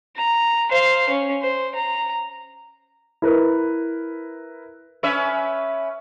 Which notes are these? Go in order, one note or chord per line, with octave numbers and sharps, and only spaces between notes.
A#5
C5 F5
C#4
C5
A#5
E4 A#4 B4
C#4 B4 E5